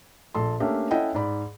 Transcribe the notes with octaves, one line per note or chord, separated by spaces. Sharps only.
A#1 A4 C6
A3 A#3 C#4 D4 G4 E5
C#4 E4 A4 D#5 F#5 G5
G#2 D5 B5